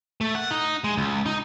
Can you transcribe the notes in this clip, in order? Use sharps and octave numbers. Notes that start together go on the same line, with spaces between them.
A3
F#5
D#4
G#3
C#2
D#4